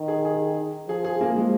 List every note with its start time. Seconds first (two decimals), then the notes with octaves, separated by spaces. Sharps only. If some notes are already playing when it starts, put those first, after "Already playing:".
Already playing: D#3
0.08 G#4
0.25 G#4
0.88 F3 G#4
1.04 G#4
1.21 A#3
1.36 G#3